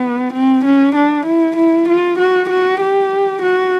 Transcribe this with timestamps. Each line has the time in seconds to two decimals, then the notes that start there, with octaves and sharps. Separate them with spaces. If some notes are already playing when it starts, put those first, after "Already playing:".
Already playing: B3
0.33 C4
0.65 C#4
0.96 D4
1.26 E4
1.57 E4
1.89 F4
2.19 F#4
2.50 F#4
2.81 G4
3.42 F#4